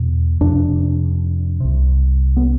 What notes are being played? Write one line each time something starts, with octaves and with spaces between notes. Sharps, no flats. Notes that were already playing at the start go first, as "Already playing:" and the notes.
Already playing: E2 B2
F2 C3 D4
C2 C3
B3